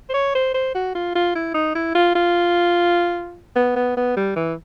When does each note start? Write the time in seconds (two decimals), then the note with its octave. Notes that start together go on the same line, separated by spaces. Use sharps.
0.09 C5
0.14 C#5
0.35 C5
0.54 C5
0.75 F#4
0.95 F4
1.15 F4
1.35 E4
1.54 D#4
1.75 E4
1.95 F4
2.15 F4
3.56 B3
3.76 B3
3.97 B3
4.17 G3
4.36 E3